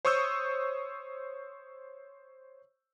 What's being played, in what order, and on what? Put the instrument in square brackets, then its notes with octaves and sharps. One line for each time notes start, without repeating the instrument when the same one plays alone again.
[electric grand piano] C5 C#5 C#6 D#6 E6 G6